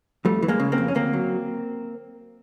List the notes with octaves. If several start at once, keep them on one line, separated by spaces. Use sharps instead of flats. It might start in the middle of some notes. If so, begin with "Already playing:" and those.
F2 G3 A3
E3
G#3 A#3
C#3
A#3 C4
F2
C#4
D2 A#3 C4
F#3